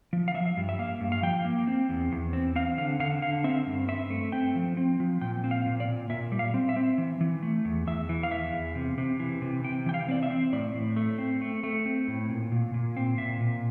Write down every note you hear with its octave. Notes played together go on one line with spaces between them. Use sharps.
F3
F5
F3 E5
G2
E5
A#3 F5
G2
F5
F3 G5
A#3
C4
E2
E2
C4
C4 F5
D3 F5
D3 F5
D3 F5
C4 E5
G2
C4 E5
A3
C4 G5
F3
C4
F3
A#2 G5
C4
F5
A#2
D5
A#2
A#2 E5
G3
F5
C4
E5
C4
E3
E3
A3
E2
E2 E5
E3
F5
E2 E5
E2
C3
C3
E3
C3
C3 G5
E3 G5
F5
C4 D5
E5
C4
A2 D5
A2
A3
C4
A3
A3
C4
A2
A#2
A#2
A#2
C4
A#2 E5
A#2